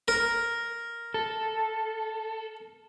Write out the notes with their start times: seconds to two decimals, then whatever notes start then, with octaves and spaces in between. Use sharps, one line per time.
0.08 A#4
1.14 A4